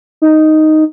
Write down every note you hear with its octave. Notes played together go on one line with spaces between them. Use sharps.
D#4